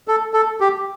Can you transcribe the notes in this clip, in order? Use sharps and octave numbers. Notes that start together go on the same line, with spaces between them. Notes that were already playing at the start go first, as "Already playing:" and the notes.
A4
A4
G4